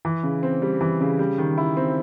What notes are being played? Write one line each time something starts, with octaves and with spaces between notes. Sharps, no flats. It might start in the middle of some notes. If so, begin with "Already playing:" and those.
E3
C#3
C4
G3
E3
C#3
G3
D#3
E4
C4